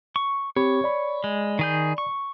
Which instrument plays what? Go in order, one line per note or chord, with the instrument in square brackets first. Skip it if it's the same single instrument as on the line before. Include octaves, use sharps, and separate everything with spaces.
[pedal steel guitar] C#6
[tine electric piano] C4 G4 B5 [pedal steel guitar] C#5
[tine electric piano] D5 B5
[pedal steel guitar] G#3
D#3 G#4 G6
C#6